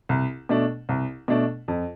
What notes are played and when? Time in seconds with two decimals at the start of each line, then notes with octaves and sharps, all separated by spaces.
0.09 C2
0.49 B2 A3 D4
0.89 C2
1.28 B2 A3 D4
1.68 F2